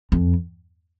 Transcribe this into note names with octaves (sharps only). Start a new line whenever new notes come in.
F2